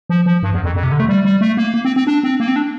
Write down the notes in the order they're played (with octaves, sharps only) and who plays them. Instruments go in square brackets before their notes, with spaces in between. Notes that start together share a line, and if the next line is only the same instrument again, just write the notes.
[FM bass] F3
F3
G2
E2
F2
F2
C3
D3
A3
G3
G3
A3
A#3
A#3
C4
C4
D4
C4
A#3
C4
D4